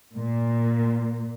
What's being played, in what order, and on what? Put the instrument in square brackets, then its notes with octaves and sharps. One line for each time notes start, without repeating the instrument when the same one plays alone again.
[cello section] A#2